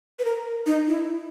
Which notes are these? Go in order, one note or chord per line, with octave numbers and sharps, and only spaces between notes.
B4
A#4
D#4
E4